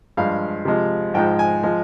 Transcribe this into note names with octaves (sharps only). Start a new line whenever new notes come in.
G2 F3 G#3 F5
C3 F3 G#3
G#2 F3 G#3 G5
G#5
F3 G#3